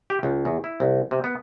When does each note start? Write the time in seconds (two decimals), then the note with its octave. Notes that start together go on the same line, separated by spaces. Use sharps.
0.10 G4
0.23 C#2
0.45 E2
0.64 E4
0.80 C2
1.11 C3
1.24 B3